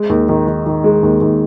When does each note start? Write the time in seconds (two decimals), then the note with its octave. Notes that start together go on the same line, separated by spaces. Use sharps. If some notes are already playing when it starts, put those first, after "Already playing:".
Already playing: G#3
0.10 D#2
0.29 D#3
0.48 D#3
0.66 D#3
0.84 G#3
1.03 D#2
1.21 D#2